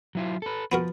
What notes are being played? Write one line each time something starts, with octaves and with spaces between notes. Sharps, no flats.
F#3 E4 F4
A4 B4
F3 B3 F#4 A#4